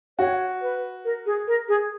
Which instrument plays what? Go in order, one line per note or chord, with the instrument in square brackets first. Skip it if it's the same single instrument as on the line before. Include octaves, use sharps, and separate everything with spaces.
[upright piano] F#4 [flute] C#5
[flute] B4
A#4
G#4
A#4
G#4